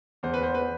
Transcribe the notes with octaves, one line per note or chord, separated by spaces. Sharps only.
E2 C5
B4
C5
B4